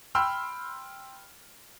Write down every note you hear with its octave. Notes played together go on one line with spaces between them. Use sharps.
G5 B5 C6 E6 F6